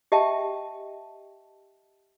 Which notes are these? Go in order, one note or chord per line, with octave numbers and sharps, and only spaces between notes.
G4 D#5 E5 G5 A5